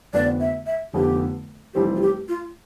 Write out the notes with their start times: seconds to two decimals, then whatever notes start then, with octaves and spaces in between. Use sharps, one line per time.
0.13 F1 F2 D3 F3 B3 D5
0.40 E5
0.66 E5
0.93 F1 F2 D3 F3 B3 G4
1.74 F1 F2 E3 G3 C4 G4
1.96 F4
2.01 G4
2.29 F4